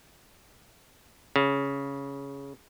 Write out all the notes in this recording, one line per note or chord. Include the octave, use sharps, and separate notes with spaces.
C#3